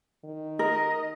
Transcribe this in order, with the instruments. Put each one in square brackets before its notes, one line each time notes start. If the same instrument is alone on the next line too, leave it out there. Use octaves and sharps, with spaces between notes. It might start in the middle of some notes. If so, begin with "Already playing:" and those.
[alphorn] D#3
[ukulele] A#4 [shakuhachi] D#5